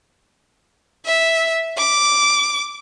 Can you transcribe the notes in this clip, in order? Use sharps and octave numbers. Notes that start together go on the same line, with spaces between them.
E5
D6